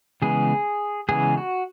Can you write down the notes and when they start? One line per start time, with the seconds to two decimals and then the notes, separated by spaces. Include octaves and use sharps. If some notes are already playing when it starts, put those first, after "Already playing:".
0.22 C#3 E3 G#3 B3 G#4
1.09 C#3 E3 G#3 B3 G#4
1.37 F#4